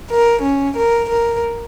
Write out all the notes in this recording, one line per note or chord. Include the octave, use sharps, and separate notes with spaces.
A#4
C#4
A#4
A#4